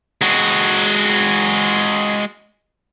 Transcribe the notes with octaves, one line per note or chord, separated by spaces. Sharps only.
G#3 F#4